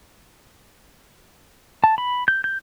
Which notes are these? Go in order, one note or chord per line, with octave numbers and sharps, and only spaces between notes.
A5
B5
G6
G6